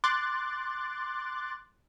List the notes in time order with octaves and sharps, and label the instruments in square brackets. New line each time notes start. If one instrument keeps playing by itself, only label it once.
[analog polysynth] C6 D6 F#6 A6